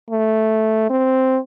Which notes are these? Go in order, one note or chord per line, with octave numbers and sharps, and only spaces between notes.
A3
C4